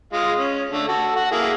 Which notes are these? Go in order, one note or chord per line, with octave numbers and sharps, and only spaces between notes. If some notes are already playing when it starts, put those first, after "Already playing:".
G#3 F4
C#4
D3 A3
F#4 A4
F#4 F#5
A#3 E4 G#4